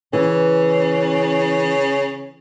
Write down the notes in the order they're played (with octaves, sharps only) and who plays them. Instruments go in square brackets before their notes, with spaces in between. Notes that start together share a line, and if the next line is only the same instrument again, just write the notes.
[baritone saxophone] C#3 [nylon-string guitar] E3